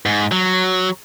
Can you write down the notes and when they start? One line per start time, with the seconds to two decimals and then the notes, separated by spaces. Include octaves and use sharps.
0.06 G#2
0.32 F#3